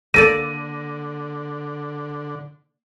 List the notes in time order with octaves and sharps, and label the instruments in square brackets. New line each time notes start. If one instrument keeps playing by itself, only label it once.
[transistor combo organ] D3 [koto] A#3 A4 D5 [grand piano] A#6 D#7